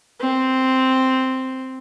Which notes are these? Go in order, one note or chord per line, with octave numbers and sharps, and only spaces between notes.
C4